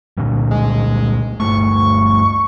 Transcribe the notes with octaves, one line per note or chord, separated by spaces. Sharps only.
A#2 D3 G3
G#3
G1 G2 A3 C#6